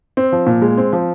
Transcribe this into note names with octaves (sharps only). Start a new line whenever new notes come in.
C4
F3
A#2
G#3
C4
F3